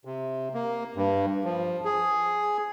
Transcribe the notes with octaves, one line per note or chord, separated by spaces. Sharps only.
C3
A#3
G2
F3
G#4